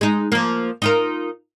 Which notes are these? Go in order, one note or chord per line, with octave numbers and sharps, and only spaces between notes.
G#3 D#4
F3 A#3
D#4 F4 A#4